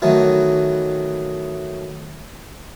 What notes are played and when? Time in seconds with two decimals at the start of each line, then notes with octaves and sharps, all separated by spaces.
0.02 D#3 E3 F#3 A3 D#4